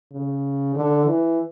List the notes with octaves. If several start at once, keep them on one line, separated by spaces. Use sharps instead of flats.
C#3
D3
E3